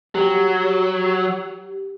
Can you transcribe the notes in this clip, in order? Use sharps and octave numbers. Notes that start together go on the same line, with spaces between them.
F#3 G4